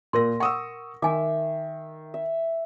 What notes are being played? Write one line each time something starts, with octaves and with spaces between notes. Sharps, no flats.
A#2 A#4 C6 A#6
F#5 C#6 D#6 E6
D#3 E5 G#5 D6
E5